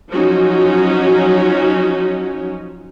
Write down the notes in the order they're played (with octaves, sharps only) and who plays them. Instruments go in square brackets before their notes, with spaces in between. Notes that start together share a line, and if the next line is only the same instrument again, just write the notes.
[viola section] F3 F#3 C#4 D#4 F#4